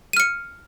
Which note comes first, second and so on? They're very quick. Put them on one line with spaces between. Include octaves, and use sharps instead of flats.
D#7 F6 C#7